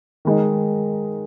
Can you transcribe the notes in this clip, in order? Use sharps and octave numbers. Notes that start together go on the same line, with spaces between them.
D#3 G#3 D#4